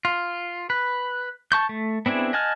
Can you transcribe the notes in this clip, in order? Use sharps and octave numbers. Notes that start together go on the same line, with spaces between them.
F4
B4
A5 C#6 G6
A3
B3 C4 D4 E4 G#4
D#5 F#5 G#5 A5 F6